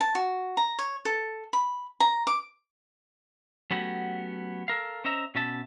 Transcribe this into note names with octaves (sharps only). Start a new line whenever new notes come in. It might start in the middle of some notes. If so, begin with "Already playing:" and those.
A5
F#4
A#5
C#5
A4
B5
A#5
D6
F#3 A3 B3 C#4 F#4 G4
A4 A#4 F5
C#4 C5 D#5 E5 A#5
B2 C#4 E5 A5